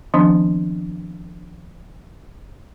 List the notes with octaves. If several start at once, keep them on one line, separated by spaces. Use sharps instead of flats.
D#3 F3 B3 C4 D4 C6